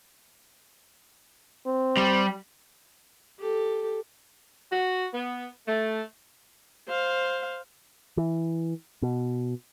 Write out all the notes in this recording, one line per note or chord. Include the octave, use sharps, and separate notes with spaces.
C4
G3
G4 A4
F#4
B3
A3
C5 F5
E3
B2